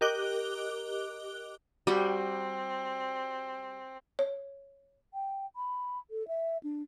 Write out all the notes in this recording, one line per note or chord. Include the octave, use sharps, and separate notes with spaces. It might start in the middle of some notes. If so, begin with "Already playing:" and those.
G4 A#4 D#5 D6 F#6 G7
G3 C4 F#4
C#5
G5
B5
A4
E5
D4